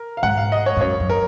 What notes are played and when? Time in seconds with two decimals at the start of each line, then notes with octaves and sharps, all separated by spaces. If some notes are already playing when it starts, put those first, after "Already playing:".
Already playing: A#4
0.17 F5
0.23 G#2 F#5
0.37 F5
0.52 D#5
0.66 C#5
0.77 G#2
0.81 F#2 C#5
1.00 F#2
1.10 A#4